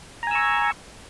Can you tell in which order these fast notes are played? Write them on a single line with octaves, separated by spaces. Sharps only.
A#5 G#5 E6 C#6